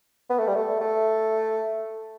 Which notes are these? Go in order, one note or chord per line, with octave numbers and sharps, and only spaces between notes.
B3
A3
G3
A3
A3